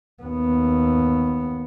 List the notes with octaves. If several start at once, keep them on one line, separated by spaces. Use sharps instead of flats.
D#2 B3